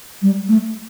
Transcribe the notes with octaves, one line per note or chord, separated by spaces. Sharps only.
G3
A3